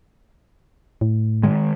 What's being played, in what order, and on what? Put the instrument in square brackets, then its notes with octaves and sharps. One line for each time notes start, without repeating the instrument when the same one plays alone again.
[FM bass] A2
[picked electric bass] D#3 G#3